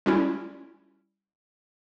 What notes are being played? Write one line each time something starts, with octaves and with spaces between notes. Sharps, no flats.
G3 C#4 E4